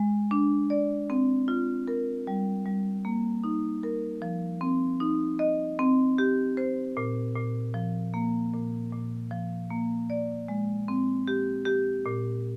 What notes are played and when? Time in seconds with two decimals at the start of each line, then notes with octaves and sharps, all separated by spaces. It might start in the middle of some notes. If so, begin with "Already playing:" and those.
Already playing: G#3
0.31 D4
0.70 D5
1.10 C4
1.48 F4
1.88 A#4
2.27 G3
2.66 G3
3.05 A#3
3.44 D#4
3.83 A#4
4.22 F3
4.61 C4
5.00 D#4
5.39 D#5
5.79 C4
6.18 G4
6.57 C5
6.97 A#2
7.36 A#2
7.74 F3
8.14 A#3
8.53 A#2
8.92 A#2
9.31 F3
9.70 A#3
10.10 D5
10.48 G#3
10.88 C4
11.28 G4
11.65 G4
12.06 A#2